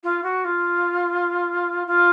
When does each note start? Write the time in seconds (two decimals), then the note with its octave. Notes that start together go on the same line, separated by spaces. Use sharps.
0.03 F4
0.23 F#4
0.44 F4
1.87 F4